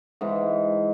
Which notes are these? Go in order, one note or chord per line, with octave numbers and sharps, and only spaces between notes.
G#2 E3